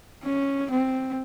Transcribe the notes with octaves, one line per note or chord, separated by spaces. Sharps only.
C#4
C4